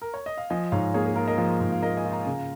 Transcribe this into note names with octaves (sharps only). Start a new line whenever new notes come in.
A#4
C#5
D#5
F5
F3 D#5 G#5
G#2 C#5 F5
A#3 G#4 C#5
G#4
F4 A#4
A#4 D#5
F3
G#2
F5
A#3 A#4 D#5
D#5 G#5
F4
F5 A#5
C#3